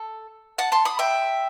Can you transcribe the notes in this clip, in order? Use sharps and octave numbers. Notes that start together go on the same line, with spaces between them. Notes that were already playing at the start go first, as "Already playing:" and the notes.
Already playing: A4
F#5 A5
A5 C6
B5 D#6
E5 G5